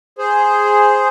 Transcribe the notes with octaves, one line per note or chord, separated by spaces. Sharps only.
G#4 C5